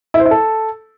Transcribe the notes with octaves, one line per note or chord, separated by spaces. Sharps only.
E4
C5
E4
A4